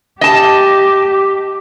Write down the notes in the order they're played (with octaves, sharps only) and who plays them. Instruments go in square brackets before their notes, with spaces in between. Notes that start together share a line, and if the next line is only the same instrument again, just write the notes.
[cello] G4 [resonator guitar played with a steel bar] D#5 A5